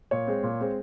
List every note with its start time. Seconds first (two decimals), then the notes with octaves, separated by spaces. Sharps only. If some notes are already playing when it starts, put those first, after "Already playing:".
0.11 A#2 C#5
0.27 G#3 C4
0.43 A#2
0.61 G#3 C4